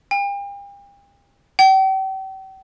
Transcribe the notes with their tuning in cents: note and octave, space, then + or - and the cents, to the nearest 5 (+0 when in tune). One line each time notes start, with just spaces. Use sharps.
G5 +40
G5 -40